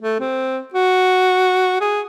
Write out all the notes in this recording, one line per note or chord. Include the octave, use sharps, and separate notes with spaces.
A3
C4
F#4
G#4